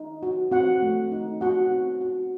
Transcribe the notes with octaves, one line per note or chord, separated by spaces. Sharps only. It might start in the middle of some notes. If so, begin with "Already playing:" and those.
Already playing: D#4
F#4
C4 F#4 F#5
A3
D#4
C4 F#4 F#5
C4
F#4